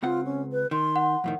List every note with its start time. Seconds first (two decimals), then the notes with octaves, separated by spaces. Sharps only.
0.03 C#2 C4 F4 F#5
0.24 C#4
0.52 B4
0.71 D#3 C6
0.96 F#5
1.24 F2 A2 D#3